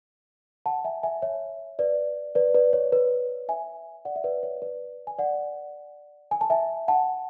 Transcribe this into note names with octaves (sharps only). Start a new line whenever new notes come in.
F#5 A5
E5 G#5
E5 G#5
C#5 E5
B4 D5
B4 D5
B4 D5
C#5
B4
E5 G#5
D5 F#5
E5
B4 D5
C#5
B4 D5
G#5
D5 F#5
G#5
A5
E5 G#5
F#5 A5